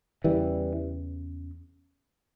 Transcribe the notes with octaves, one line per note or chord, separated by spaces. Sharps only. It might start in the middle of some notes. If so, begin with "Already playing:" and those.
E2 C#3 E3 G3